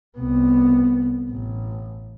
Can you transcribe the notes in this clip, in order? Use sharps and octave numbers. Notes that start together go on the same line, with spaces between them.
C2 B3
A1